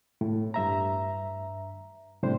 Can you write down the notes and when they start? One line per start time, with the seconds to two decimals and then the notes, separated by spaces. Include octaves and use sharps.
0.21 A2
0.54 G2 E5 A#5
2.23 A2 C3 G3 D4 C5